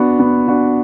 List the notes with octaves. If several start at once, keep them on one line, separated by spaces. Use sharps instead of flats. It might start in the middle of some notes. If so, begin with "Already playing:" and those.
Already playing: B3 D4 F#4
B3
D4 F#4